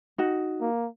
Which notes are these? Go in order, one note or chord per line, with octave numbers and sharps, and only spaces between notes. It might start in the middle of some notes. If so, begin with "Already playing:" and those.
D#4 F#4
A#3